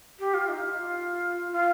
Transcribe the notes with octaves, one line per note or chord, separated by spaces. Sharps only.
G4
F4
D#4
F4
F4